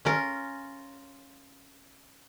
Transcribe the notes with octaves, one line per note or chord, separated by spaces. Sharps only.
C#4 F4 A#4